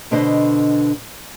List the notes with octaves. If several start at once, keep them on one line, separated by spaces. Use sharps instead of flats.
B2 D3 D4 B4 C5 D#5